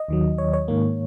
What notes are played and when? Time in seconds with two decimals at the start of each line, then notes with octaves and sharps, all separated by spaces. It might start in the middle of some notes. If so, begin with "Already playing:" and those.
Already playing: D#5
0.08 D#2 D#3 F#3
0.38 C#5
0.53 C#5
0.68 G#2 D#3 A#3